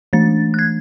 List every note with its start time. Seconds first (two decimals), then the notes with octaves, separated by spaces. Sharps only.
0.13 E3 A3 D4 A6
0.54 F#6
0.59 G#6